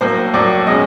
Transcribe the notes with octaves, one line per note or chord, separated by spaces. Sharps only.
A2 F#3 A#3 C5
A2 F#3 A#3 D5
B2 G#3 C#4 D#5